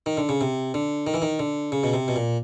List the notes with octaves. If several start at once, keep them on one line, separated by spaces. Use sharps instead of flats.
D#3
D3
C#3
C3
D3
D#3
E3
D#3
D3
C#3
B2
C3
B2
A#2